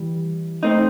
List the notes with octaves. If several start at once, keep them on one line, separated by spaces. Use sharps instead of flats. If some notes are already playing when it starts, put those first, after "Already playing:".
Already playing: E3 G3
A3 C4 D#4